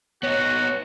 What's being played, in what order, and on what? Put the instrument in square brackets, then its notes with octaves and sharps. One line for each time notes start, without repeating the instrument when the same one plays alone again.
[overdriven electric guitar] B3 D#4 [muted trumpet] F#4 [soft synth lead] C#5